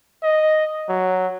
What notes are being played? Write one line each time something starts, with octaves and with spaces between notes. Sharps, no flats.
D#5
F#3